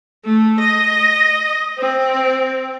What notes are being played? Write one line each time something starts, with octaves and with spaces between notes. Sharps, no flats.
A3
D#5
C4